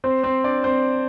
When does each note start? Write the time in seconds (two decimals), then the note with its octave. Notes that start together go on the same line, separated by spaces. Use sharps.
0.04 C4 C5
0.23 C4 C5
0.44 D4 D5
0.64 C4 C5